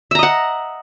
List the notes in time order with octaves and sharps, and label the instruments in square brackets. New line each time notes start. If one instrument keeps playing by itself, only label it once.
[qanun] E5
A#5
D#5
F#5